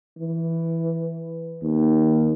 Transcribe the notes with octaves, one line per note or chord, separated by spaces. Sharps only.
E3
D#2